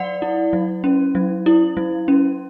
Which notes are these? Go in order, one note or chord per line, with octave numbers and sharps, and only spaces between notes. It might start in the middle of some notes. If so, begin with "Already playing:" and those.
Already playing: F#3 D5 F#5
E4
F#3
C#4
F#3
E4
F#3
C#4